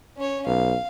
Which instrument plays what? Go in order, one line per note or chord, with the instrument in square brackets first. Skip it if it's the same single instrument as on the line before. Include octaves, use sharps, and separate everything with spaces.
[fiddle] C#4 C#5
[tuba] B1 [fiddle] F5